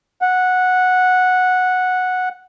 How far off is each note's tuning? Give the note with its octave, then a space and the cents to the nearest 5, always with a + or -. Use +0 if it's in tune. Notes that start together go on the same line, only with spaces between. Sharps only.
F#5 -10